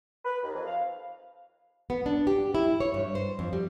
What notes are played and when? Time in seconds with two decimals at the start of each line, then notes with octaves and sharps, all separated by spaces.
0.25 B4
0.43 D#2
0.54 F2
0.66 F5
1.90 B3
2.06 D4
2.27 G4
2.55 E4
2.80 C#5
2.94 G2
3.15 C5
3.39 F2
3.53 G3